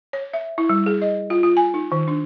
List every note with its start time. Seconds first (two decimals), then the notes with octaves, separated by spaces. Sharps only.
0.13 C#5
0.33 E5
0.58 E4
0.69 G3
0.86 G#4
1.02 D#5
1.30 F4
1.43 F4
1.57 G#5
1.74 D#4
1.92 D#3
2.08 D4